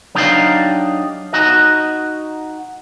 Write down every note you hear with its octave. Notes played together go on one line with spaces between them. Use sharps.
F#3 D4 D#4 G4 D5 F5
D#4 F#4 D#5